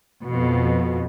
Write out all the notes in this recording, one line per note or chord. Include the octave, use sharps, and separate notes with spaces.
F2 B2